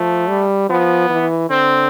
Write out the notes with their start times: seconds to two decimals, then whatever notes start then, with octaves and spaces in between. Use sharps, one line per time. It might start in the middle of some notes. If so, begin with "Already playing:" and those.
Already playing: F3 A3
0.29 G3
0.69 F3 B3
1.10 E3
1.50 D3 C4